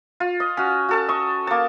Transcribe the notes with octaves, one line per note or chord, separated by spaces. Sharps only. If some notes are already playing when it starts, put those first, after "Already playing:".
F4
D#5
C#4 F#4
F#4 A4 A5
D#5 C#6
A#3 A5